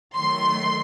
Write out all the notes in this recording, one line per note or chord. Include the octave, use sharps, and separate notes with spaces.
D#3 F#3 A3 C6